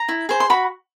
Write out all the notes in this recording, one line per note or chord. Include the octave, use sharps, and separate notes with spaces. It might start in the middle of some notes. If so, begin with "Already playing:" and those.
Already playing: A#5
E4
G#4 C5
C6
F#4 B5